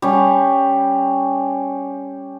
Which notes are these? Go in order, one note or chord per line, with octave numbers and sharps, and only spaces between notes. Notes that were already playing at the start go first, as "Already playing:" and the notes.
G3 C#4